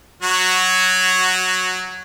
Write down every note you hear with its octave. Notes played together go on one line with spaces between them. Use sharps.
F#3 F#4